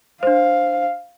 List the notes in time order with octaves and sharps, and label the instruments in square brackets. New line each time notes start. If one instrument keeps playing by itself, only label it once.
[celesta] D4 C5 [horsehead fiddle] F5